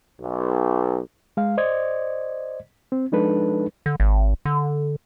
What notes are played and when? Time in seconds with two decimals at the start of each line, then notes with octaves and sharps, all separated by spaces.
0.20 B1
1.37 G#3 F5
1.58 C5 D5 D#5 G#6
2.92 C4
3.12 F3 G#3 D4 D#4 A4 B4
3.86 D3
4.00 G#1
4.45 D3